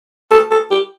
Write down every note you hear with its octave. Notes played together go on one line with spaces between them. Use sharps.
A4
A4
G4